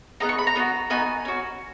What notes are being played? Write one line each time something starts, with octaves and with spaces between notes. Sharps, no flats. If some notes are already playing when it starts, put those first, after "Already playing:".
B3 D#4 G#4 A#5
C#6
B5
A#5
B3 D#4 F#4
B3 D#4 F#4 G#5
C#4 F#4